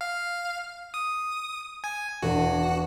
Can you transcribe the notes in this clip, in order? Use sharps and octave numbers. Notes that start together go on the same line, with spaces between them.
F5
D#6
G#5
E1 D4 F#4 E7